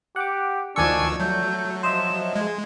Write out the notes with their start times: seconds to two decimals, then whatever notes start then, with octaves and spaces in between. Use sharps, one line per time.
0.16 G4 F#5 D6
0.76 D2 D#3 F3 D4 D5 G#5 C#6 E6
1.19 F#3 A3 G6
1.83 F3 C5 D#5 E5 E7
2.36 G#3 G#6